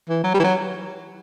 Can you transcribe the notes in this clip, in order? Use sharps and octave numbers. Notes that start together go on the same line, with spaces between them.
E3
F#3
G3
E3
F#3